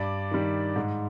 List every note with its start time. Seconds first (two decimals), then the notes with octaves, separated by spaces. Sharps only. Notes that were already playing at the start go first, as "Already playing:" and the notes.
Already playing: G2 D5
0.31 D#3 G3
0.76 G#2